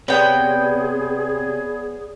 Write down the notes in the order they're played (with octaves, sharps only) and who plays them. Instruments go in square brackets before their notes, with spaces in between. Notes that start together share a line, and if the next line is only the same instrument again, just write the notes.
[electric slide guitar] C3 [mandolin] B3 G5 [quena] G#4 [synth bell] C#5 D5